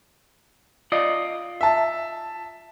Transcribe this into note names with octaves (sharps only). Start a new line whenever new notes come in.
F4 D5 D#5
E5 A5